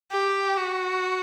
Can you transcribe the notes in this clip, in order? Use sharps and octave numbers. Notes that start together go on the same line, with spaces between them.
G4
F#4